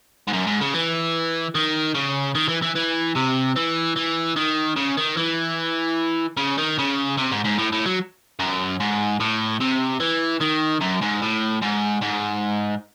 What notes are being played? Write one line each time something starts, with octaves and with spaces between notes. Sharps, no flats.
G#2
F#2
G#2
C#3
E3
D#3
C#3
D#3
E3
E3
E3
C3
E3
E3
D#3
C#3
D#3
E3
C#3
D#3
C#3
C3
G#2
G#2
A2
A2
F#3
F#2
G#2
A2
C3
E3
D#3
F#2
G#2
A2
G#2
G#2